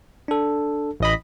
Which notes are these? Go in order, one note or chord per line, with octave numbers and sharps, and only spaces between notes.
D4 A4
A1 D#5 B5